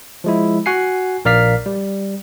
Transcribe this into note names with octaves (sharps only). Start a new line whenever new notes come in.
F3 G#3 E4
F#4 F#5 G#5 C7
A#1 A#4 D5 F5 F6 B6
G3